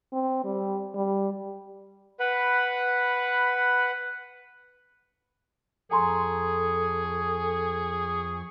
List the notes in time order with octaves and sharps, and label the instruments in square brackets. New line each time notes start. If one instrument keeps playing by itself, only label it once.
[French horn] C4
G3
G3
[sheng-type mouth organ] B4 F#5 B5
[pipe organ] F2 C#6 [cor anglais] G#4 [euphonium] A4 [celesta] G#5 A#5 C6